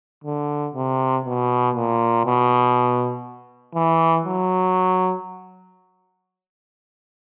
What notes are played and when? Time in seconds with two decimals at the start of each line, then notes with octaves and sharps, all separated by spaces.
0.24 D3
0.74 C3
1.25 B2
1.75 A#2
2.25 B2
3.75 E3
4.25 F#3